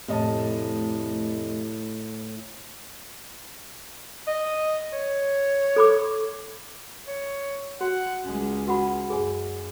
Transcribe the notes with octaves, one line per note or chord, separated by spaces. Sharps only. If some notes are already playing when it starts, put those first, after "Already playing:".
F1 A2 D#5 A5
D#5
C#5
A4 B5 D6
C#5
F#4 F#5
C#2 G#3 C#4
F#4 F#5 B5
F#2 G#4 G#5